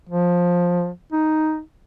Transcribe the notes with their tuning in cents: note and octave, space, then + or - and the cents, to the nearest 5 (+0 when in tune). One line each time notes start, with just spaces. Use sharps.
F3 +15
D#4 +5